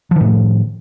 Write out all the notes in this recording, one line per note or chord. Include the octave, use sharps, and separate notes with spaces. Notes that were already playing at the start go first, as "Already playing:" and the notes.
A2 D#3 F3